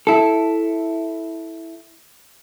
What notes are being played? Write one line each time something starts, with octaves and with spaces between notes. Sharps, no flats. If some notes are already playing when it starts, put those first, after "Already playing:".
E4 A4